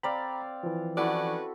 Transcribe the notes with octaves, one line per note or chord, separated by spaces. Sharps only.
C4 D5 F5 G5 A#5 B5
E3 F3
C#4 E4 F#4 A4 B4 D5